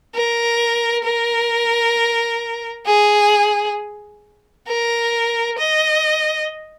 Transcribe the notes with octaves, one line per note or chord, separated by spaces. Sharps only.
A#4
A#4
G#4
A#4
D#5